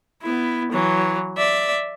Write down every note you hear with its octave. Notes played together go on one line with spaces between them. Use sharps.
B3 E4
E3 F#3
D5 E5